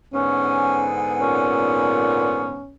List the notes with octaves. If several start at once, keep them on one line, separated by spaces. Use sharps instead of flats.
G#2 D3 B3 C#4 G#5
A#2 C#4